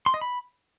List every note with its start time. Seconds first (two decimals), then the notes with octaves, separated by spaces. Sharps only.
0.06 C6
0.14 D#5
0.21 B5